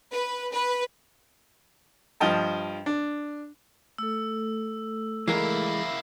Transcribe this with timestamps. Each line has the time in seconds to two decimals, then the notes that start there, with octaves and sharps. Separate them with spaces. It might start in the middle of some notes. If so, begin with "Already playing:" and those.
0.12 B4
0.52 B4
2.20 G2 F3 D#5 G5 A5
2.86 D4
3.98 A3 A4 E6
5.28 E3 G#3 A#3 E4 A#4 C7